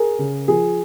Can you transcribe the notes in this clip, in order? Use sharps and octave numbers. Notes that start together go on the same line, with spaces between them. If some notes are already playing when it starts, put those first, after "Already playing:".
Already playing: G#4 A#4
C#3
F3 G#4